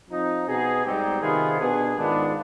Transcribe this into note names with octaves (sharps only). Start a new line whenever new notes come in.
F3 C4 D#4
B2 B3 D#4 G#4
G#2 G3 C4 D#4 G4
C3 D#3 B3 F4 G#4
B2 B3 D4 G#4
G#2 D#3 B3 D4 F4